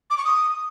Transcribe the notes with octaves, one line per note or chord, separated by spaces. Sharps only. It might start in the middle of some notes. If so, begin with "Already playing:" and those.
D6
C#6
D#6